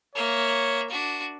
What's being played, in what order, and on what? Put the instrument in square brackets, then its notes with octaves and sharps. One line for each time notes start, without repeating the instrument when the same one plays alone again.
[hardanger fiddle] A#3 E5 [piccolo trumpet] C#5
[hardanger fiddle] D4 F#4